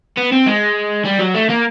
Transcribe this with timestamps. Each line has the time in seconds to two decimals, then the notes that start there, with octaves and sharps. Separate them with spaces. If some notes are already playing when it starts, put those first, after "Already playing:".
0.17 B3
0.32 C4
0.46 G#3
1.05 G3
1.19 F#3
1.35 A3
1.49 A#3